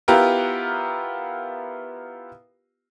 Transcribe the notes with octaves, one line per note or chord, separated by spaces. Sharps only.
B3 E4 F4 G4 A#4 B4